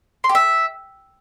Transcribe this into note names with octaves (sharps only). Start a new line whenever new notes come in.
C6
G4
E5